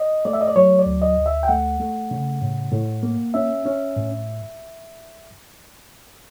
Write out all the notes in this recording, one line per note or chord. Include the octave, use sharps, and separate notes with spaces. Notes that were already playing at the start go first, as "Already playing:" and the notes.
Already playing: D#5
A3 D5
E5
D#5
D5
F#3 C#5
D5
D2
D#5
D2
E5
G5
A3 F#5
A3
C#3
A2
A2
A#3
C#4 E5
C#4
A2